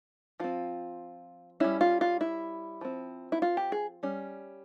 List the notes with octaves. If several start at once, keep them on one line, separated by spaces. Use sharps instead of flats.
F3 C4 F4
G3 C#4 E4
F4
F4
E4
F3 C4
E4
F4
G4
G#4
G3 C#4